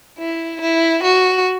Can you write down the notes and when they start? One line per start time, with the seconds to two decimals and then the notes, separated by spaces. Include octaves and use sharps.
0.19 E4
0.61 E4
1.04 F#4